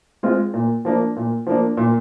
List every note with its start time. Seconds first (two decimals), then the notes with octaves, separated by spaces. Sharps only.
0.23 G#3 C4 F4
0.54 A#2
0.85 F3 A#3 D4
1.16 A#2
1.47 F3 A#3 D4
1.77 A#2